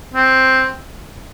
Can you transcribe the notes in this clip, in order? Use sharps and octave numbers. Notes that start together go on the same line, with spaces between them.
C4